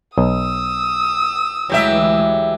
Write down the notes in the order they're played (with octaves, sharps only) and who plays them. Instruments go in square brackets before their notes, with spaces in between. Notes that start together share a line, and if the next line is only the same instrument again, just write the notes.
[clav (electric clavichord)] B1 D#5 [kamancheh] D#6 E6
[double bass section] D2 E3 G#3 [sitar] F#3 G4 E5